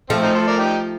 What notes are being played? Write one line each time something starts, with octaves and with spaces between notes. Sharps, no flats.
F3 A3 C4
C4 D#4
A4 C5
A#4 D5
D#4 G4